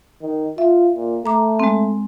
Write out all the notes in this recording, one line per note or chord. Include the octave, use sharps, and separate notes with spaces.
D#3
F4 E5
A#2
A3 A#5 D6
G#3 C4